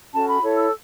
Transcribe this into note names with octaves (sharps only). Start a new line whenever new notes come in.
C#4 F#4 A4 A5
B5
E4 A4 C#5
E6